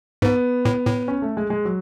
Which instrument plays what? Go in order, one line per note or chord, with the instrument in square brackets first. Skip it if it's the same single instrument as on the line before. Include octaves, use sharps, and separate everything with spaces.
[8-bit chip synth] G#2 [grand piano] B3
[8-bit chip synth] A2
A2
[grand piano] C#4
A3
G#3
G#3
F#3